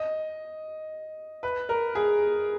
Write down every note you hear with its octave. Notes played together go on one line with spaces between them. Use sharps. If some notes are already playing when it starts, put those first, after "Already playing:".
Already playing: D#5
B4
A#4
G#4